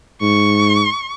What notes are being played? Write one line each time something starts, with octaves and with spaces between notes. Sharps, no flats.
G#2 C#6